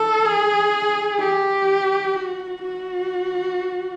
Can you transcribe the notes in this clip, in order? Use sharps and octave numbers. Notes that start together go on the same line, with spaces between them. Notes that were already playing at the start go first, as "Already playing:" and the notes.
Already playing: A4
G#4
G4
F#4
F#4